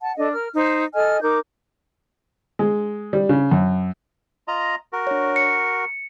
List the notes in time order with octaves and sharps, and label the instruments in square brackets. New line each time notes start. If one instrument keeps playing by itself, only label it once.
[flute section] F#5 A5
D4 A4 D5 D#5
A#4 F6
D#4 C5
A4 D#5 G#5 F6
D#4 A#4 D6 G6
[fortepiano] G#3
G3
C#3
F#2
[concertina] F4 D#5 A#5
F#4 A#4
[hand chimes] D4 C#5
C#7